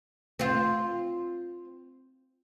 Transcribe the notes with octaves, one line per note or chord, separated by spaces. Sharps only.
C4 F4